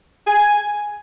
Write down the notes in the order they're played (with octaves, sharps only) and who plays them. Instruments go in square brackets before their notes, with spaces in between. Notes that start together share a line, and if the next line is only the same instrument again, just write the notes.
[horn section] G#5